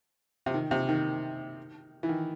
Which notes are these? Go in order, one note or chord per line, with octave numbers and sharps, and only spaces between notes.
C3
D#3
C3
D#3
E3
D#3